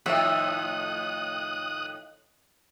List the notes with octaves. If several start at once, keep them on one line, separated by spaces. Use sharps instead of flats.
A2 D#3 F3 E5 D#6 F#6